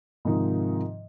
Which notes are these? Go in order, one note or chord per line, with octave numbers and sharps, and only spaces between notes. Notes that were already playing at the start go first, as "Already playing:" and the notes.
G#2 C3 D#3 F3 D#4